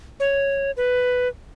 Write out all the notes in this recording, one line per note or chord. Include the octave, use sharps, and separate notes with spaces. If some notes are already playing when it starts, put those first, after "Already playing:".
C#5
B4